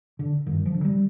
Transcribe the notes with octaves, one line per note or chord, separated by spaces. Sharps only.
D3
G2 D#3
F3
D3
G3